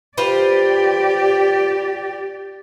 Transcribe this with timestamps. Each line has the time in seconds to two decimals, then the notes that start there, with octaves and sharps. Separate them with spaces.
0.17 F4 G4 B4 C5 D5